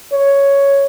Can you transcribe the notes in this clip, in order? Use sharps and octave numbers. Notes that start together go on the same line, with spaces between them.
C#5